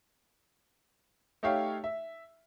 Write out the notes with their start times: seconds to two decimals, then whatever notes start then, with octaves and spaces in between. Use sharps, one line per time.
1.43 A3 D#4 G4 C#5 F5
1.84 E5